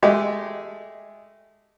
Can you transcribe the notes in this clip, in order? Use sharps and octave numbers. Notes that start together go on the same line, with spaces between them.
G#3 A3 G4